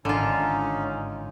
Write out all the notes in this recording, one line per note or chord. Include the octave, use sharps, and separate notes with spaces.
G#1 D3 C#4 D#4 F4